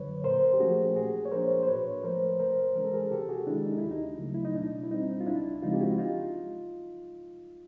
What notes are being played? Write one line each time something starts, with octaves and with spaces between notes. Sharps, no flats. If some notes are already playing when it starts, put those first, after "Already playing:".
Already playing: F#2 D3 F#3 B4 C#5
A#2 A#4 C5
G4
F3 A3 C#4 F#4 G#4
A#2 F#4 G#4
C#5
F3 A#3 D4 A#4 C5
C5
A2 B4 C#5
F3 A3 A#4 C5
C3 A#4 C5
E3 G#3 C#4 A#4
A4
G#4 A#4
C3 G4 A4
F#4 G#4
D#3 G#3 D4 E4
D#4
E4
D2
D#4
C#3 F#3 A3
E4
D#4
B2 D4
E4
G3 C4 D#4
F4
C#2 D4 E4
C#3 F3 G#3 C4 D#4 F4
G4
E4 F#4
D#4 F4